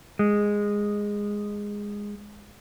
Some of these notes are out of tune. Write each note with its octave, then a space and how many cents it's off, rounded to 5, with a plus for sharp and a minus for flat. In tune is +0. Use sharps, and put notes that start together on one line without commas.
G#3 -10